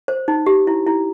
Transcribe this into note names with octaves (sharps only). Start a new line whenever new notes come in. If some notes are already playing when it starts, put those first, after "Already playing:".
C5
D#4
G4
E4
E4